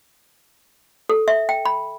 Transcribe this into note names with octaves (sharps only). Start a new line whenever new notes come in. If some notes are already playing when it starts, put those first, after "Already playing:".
A4
E5
G5
B5